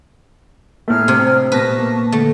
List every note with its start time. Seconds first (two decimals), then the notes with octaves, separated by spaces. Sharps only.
0.88 A2 A3 G#4 A#5 F6
1.08 C3
1.52 A#2 B3 B4 A5 C#6 A#6
1.79 A#3
2.12 D3 A3